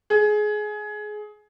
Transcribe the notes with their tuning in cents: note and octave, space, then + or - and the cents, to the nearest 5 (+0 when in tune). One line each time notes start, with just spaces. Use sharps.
G#4 +20